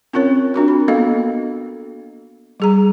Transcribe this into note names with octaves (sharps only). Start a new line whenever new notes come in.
C4 C#4 F4 A#4 C#5
C4 D4 F#4 A#4
B5
A#3 B3 F#4 A4 D#5 F5
G3 G#4 A#5